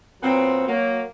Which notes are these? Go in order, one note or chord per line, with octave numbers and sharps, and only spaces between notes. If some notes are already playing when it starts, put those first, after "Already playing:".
A#2 F#3 B3 C4
F#3 A#3